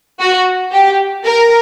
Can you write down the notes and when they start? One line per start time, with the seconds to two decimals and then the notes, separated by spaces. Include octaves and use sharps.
0.20 F#4
0.73 G4
1.26 A#4